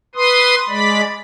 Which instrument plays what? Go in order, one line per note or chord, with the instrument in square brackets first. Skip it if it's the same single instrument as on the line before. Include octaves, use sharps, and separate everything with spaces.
[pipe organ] B4 C6 D#6
G#3 D5 B5